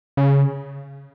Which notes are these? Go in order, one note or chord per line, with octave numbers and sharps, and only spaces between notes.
C#3